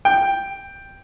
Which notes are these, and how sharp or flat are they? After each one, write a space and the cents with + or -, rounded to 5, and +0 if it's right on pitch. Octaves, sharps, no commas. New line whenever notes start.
G5 +5